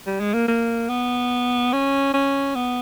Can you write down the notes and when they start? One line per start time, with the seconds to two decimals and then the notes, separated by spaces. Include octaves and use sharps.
0.07 G3
0.20 G#3
0.34 A#3
0.48 A#3
0.89 B3
1.73 C#4
2.14 C#4
2.55 B3